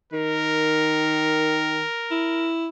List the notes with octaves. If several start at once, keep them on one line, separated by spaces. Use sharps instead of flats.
D#3 A#4
E4